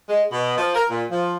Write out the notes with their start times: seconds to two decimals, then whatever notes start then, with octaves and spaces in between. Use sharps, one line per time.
0.09 G#3
0.32 B2
0.58 F3
0.75 A#4
0.90 A#2
1.10 F3